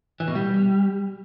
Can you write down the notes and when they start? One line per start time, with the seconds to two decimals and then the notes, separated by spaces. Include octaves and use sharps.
0.20 E3
0.28 B2
0.35 G3